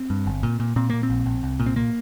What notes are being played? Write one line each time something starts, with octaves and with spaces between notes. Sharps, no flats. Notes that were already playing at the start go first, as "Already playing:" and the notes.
Already playing: C4
G2
G1
A#2
A#2
A#2 C4
A#2 A#3
C4
A#1
A#1
C2
A#2
C4
A#2 A#3